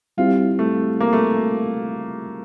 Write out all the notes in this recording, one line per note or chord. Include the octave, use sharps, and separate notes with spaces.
G3 C4 E4 F4 G4
A3
A#3
A3